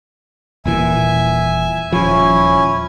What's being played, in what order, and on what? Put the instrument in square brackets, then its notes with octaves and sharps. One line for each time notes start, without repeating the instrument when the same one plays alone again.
[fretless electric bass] D#1 A#2 E3 [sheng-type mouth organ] E5 G#5
[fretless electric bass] D#1 F3 [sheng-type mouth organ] C#4 E4 G#5